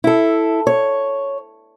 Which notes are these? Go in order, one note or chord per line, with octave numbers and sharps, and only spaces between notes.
E4 A4
C#5